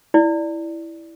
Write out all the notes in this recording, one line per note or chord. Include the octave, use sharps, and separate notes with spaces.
E4 D5